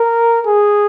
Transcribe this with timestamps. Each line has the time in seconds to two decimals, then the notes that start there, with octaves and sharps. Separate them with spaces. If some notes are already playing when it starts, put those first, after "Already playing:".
Already playing: A#4
0.46 G#4